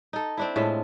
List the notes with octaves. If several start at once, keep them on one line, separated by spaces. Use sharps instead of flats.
D#4 A4
C4 D4 E4
A2 G#3 F4 E5